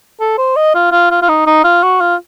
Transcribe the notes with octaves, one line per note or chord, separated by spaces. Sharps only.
A4
C5
D#5
F4
F4
F4
F4
D#4
D#4
F4
F#4
F4